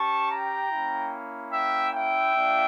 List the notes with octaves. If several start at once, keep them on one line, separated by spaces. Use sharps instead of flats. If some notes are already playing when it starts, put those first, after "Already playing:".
Already playing: C#4 G4 A5 C#6
G5 A#5
A#3 C#4 E4
E5 G5
E5 G5
A#3 D4 F4